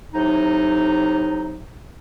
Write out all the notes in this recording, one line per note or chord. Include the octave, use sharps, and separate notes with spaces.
A2 C3 F#3 D#4